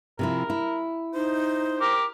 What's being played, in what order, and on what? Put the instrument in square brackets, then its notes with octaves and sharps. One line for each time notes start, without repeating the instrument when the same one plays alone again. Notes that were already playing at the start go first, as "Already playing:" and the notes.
[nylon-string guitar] C3 F3 E4 [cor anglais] A#4
[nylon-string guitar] E4
[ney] D#4 [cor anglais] C5
[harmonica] G4 A#4 D6